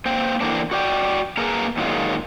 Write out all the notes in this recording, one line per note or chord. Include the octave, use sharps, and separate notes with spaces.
A#3 C5 G5
D3 E3 A#3 C4 D4
F#4 D5 G5
A#3 G#4 A#4 B4 A#5
A#2 D#3 F#3 G#3 F4